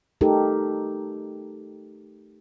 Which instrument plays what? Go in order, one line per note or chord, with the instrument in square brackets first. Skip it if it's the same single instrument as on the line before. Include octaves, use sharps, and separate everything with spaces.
[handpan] A3 D#4 G4 A4 A#4